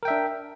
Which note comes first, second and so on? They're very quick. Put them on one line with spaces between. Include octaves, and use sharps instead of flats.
A#4 G5 E5 D4